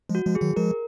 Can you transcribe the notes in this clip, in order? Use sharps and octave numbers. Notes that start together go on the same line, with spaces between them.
F3 G#3
F#4
F3 G#3
G#4
D#3 F#3
F3 G#3 A#4